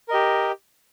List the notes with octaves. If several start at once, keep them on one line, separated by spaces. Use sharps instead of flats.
G4 A#4 D#5